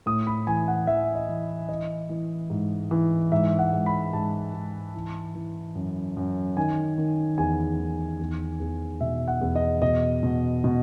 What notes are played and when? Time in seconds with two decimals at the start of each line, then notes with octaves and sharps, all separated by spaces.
0.06 A2 D#6
0.27 B5
0.47 E3 G#5
0.68 F#5
0.87 E3 E5
1.15 D#5
1.29 E3
1.69 E3 D#5
2.10 E3
2.50 G#2
2.91 E3
3.32 G#2 E5
3.59 F#5
3.73 G#2
3.86 B5
4.13 G#2 A5
4.54 G#2
4.94 E3
5.35 E3
5.75 F#2
6.17 F#2
6.57 D#3 G#5
6.98 D#3
7.38 E2 G#5
7.79 D#3
8.19 E2
8.60 E2
9.00 B2 E5
9.28 F#5
9.41 E2
9.55 D#5
9.82 B2 D#5
10.23 B2
10.64 B2